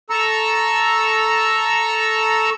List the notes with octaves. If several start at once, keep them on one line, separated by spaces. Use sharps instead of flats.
A4 A#5 C#6 E6